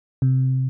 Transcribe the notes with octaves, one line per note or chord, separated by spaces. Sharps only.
C3